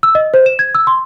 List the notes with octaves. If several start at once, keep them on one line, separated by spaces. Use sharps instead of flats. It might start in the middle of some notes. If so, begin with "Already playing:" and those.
E6
D#5
C5
E7
G#6
E6
C6